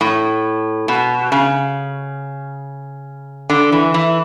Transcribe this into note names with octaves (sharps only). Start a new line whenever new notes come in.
A2
B2
C#3
D3
E3
E3